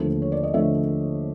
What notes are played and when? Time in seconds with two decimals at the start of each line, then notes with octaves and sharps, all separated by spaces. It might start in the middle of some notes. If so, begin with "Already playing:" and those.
Already playing: D#2 D3 F3 A3 C4
0.22 C#5
0.32 D5
0.43 D#5
0.53 D3 F3 A3 C4 E5